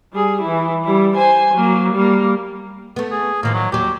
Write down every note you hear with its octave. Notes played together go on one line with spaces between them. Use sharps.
G3 G#4
E3 E4
G3 E4
C5 G#5
F#3 A#3
G3 A#3
A3 B3
G#4
A2 D#3 F3 A#3
F#3
D#2 F#3 G4